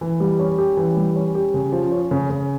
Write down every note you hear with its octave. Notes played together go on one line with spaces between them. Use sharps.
E3
G3
C#4
G4
E3
G3
C#4
G4
C#3
F3
C#4
C#3
C#3